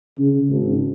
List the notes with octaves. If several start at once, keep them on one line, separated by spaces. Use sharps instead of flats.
C#3
G#1